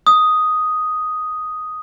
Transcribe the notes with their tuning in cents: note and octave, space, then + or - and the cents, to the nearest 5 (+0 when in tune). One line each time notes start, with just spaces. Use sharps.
D#6 +5